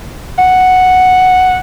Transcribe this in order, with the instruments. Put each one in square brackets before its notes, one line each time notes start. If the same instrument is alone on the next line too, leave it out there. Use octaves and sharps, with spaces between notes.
[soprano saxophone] F#5